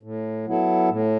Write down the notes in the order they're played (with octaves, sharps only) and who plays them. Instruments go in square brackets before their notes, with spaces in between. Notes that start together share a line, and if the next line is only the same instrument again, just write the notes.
[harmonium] A2
F#3 B3 E4 A4
A2